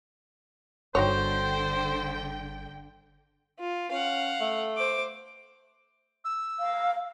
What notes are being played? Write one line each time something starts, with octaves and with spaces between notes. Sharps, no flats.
G1 D3 D#4 F#4 C5 C#5 G5
F4
C#4 F5 F#5
A3
C5 D6
E6
F5